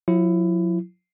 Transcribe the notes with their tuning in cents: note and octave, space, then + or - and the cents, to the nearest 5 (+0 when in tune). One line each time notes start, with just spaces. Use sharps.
F#3 -45 E4 +20